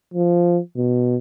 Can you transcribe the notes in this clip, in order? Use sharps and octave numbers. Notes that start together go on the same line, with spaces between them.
F3
B2